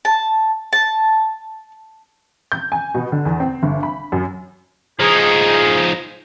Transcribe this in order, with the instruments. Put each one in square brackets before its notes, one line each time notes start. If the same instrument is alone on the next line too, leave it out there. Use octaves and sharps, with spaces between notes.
[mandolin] A5
A5
[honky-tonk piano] G6
G#5
B2
D3
E2
C4
G1
B5
F#2
[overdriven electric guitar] F3 D#4 [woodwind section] G#4